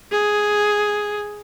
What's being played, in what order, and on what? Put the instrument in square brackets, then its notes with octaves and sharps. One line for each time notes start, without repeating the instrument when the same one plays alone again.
[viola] G#4